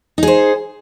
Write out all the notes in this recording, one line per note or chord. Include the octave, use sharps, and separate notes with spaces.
D#4 G#4 C5